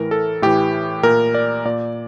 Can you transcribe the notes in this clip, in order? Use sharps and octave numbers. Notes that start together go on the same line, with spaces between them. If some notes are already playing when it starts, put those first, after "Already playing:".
Already playing: A2 E3 A#4
A4
A2 E3 G4
A#2 A#4
D5
A#2 D5